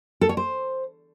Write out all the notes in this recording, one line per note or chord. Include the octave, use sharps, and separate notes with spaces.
A4
C#5
C5